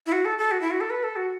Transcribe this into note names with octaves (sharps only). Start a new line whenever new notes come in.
E4
F#4
A4
A4
F#4
E4
F#4
A4
B4
A4
F#4